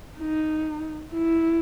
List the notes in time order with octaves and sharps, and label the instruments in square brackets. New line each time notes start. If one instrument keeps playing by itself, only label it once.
[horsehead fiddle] D#4
E4